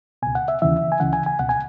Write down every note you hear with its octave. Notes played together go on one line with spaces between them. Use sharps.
C#2 B2 G#5
F#5
E5
D#2 C#3 E3 E5
G#5
C#2 C#3 E3 F#5
G#5
G#5
C#2 B2 F#5
G#5